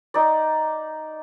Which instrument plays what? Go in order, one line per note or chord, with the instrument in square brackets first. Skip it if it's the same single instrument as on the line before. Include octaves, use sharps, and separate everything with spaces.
[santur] D#4 D5